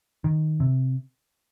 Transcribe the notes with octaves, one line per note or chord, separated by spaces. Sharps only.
D#3
C3